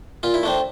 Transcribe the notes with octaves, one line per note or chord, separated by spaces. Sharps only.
A#2 F4
E4
A3 C4 D4